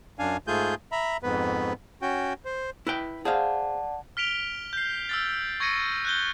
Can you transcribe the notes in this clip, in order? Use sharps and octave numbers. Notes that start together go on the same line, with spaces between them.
F#2 D4 F5 G#5
G#2 A3 F4 G#4 G#5 G6
E5 A#5 B5
F2 G#2 B3 B4
C#4 F#4 G5
C5
E4 B4 G5
G#4 C5 D5 F5 F#5 A5
F6 B6 D7 F7 G7
G6 C7
E6 F6 A6
C#6 G#6 A#6 C#7 D#7
F#6 G6 G7